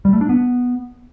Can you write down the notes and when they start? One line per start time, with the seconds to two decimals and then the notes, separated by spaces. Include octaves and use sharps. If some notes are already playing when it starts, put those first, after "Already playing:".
0.05 G3
0.13 A3
0.21 D4
0.29 B3